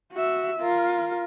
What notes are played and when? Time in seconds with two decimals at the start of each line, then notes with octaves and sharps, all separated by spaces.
0.13 F#4 E5
0.60 F4 A#4